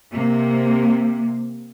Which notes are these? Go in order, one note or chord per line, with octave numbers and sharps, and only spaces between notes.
C3 A#3